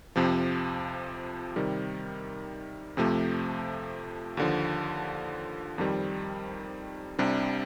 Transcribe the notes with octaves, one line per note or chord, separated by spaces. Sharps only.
F2 C3 F3
C3 D#3 G3
F2 C3 F3 A3
D#2 D3 F3
F2 D#3 G3 C4
C2 C3 G3 D4